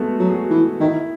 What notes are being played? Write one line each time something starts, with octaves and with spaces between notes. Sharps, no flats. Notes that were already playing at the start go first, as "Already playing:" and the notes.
Already playing: G#3 A3 B3 F#4
F#3
G#4
F#4
E3
D#3 E4